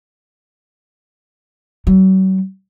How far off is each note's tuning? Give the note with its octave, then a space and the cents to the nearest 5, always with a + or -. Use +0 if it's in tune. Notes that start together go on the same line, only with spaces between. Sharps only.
F#3 +40